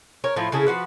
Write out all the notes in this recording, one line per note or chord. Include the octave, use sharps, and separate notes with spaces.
A#4 C#5
A2 F3 A3 E4
C#3 E4 G#4 A4
F3 F#4 B4